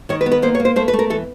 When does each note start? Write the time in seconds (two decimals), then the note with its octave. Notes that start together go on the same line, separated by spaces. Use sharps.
0.09 D#3 C#5
0.21 B4
0.26 B3
0.32 B4
0.42 A#3 C5
0.55 C#5
0.60 A#3
0.65 C5
0.76 A3 C5
0.88 B4
0.93 A3
0.99 A#4
1.10 E3 A4